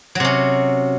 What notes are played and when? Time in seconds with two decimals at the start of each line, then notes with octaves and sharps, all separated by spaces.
0.15 F#3
0.20 C3
0.25 C#4